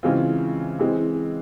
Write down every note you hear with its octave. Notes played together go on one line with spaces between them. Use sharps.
C#3 E3 G#3 C4 F4
E3 G#3 C4